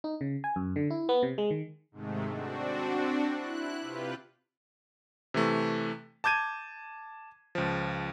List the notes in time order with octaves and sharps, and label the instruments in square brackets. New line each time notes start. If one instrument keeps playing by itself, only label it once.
[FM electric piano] D#4
C#3
G#5
F#2
D3
E4
B3
C3
G#3
D#3
[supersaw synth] G#2 C3 D#3 G#3 A3
C4 D4 F#4
E4 F#6
C3 F4 G4 B4
[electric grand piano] C3 E3 A3
A5 D6 G6 G#6 D#7
C#2 F3